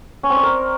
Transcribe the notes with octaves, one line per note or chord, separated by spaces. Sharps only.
C#4
C4
D5
A#4